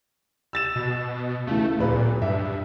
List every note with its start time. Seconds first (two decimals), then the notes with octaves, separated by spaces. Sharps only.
0.53 E6 A6 E7
0.76 B2
1.47 C#2 E3 A3
1.78 D1 A#2 B4
2.22 G2 E5